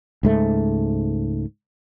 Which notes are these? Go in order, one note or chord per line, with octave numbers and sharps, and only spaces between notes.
C#2 G#2 A3